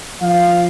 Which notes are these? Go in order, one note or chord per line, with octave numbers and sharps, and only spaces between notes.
F3 F5